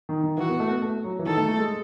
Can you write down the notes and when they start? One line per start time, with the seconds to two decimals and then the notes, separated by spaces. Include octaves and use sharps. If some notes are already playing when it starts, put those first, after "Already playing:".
0.09 D#3
0.24 D#3
0.37 E3 F#4
0.49 B3
0.60 A3
0.71 B3
0.82 A3
1.04 F#3
1.19 E3
1.26 D#3 A4
1.37 A3
1.48 A3
1.59 G#3